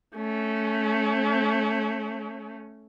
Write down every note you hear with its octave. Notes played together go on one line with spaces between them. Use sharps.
A3 C#4